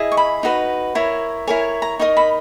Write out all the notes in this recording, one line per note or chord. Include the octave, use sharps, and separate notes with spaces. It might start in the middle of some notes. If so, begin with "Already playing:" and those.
Already playing: E4 G#4 D#5
C#6
B5
D#4 F#4 B4
E4 A#4 C#5
E4 A#4 C#5 G#5
A#5
D#4 A#4 D#5 C#6
B5